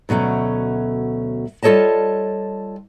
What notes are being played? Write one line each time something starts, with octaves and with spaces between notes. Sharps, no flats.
D2 B2 F#3 A3 C#4
G3 F4 A4 C#5 D#5 A5